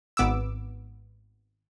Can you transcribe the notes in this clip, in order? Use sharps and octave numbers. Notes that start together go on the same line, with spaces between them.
G#1 B3 D6 E6